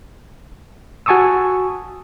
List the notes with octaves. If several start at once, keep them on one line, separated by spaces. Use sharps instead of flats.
F#4 G#5 A5 C#6 D#6 E6